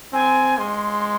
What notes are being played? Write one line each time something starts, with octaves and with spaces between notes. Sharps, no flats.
C4 G#5
G#3 C6